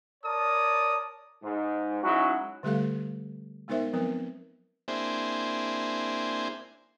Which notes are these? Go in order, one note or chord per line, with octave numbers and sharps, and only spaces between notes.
A#4 C#5 D5 A5 D#6
G#2
F#3 G#3 C#4 D#4 E4 F#4
D3 G3 A3 G4 A4 F5
G#3 B3 D#4 A#4 C5 E5
F3 F#3 B3 C4 A#4 B4
A#3 C4 D4 E4 G#4 C5